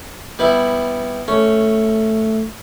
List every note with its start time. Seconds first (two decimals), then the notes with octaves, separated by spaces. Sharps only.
0.39 G3 B3 E4
1.28 A3 C#4